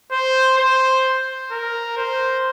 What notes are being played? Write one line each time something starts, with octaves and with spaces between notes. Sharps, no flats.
C5
C5
A#4
C5